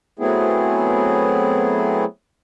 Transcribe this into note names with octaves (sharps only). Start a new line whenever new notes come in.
F#3 A3 B3 C4 E4 G#4